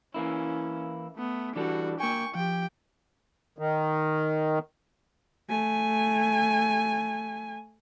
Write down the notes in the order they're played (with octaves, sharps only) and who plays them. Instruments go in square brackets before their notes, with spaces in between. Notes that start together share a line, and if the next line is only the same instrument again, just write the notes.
[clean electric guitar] E3 A#3 E4 [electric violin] C#4
[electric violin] A3 B3
[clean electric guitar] E3 G3 A4 [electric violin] D4 F#4
[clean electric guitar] A#3 G#5 [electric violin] G5 C#6
[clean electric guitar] F3 [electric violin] G4 G5
[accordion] D#3
[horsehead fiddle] A3 G#5